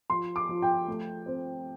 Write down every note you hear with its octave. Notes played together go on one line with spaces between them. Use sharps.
F3 C6
D6
F3
G5
A3
C4